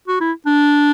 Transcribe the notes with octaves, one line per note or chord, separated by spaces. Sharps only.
F#4
E4
D4